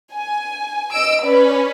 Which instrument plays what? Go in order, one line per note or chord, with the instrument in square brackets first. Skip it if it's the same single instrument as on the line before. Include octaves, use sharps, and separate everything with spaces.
[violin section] G#5
D#5 E6 D7
[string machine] C#4 [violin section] B4 D5 B5